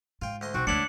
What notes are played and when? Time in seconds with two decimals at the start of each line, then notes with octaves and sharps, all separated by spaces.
0.22 G#2 F4 G5
0.41 D2 D#5 C6
0.54 B1 C4 D4 F#4
0.67 D2 G#3 B3 C#4 D4 E4 C#7 F#7